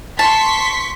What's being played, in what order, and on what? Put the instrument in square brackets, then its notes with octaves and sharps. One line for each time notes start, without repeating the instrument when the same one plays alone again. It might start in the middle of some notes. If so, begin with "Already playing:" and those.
[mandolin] A5 [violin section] C6 C#6 B6